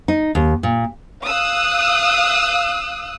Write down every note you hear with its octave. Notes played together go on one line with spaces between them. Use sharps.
D#4
D#2
A#2
F5 D#6 E6 F#6